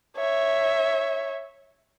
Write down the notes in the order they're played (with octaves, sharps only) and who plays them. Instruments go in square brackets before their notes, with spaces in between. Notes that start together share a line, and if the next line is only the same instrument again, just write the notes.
[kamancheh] C#5 E5